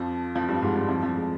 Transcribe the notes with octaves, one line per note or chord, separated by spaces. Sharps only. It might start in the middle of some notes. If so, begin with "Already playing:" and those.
Already playing: F2 F3
F2 F3
G2 G3
G#2 G#3
G2 G3
F2 F3
F2 F3
G#3